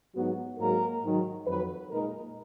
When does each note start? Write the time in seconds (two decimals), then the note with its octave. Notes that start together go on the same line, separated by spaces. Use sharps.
0.15 G#2 F#3 B3 D#4 F#4
0.59 G#2 F#3 A#3 A#4
1.03 G#2 D#3 F#3
1.47 F2 D#3 F#3 B4
1.91 A#2 G#3 D#4 A#4